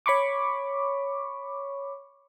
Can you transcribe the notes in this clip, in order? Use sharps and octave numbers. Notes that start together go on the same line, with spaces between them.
C#5 B5 C#6 D6